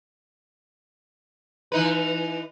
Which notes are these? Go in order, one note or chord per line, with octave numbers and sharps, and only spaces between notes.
E3 D#4 B4